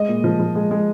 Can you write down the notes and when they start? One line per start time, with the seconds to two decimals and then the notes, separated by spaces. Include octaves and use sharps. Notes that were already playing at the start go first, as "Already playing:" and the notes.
Already playing: G#3 D#5
0.08 A#2
0.24 F3
0.39 F3
0.55 G#3
0.71 G#3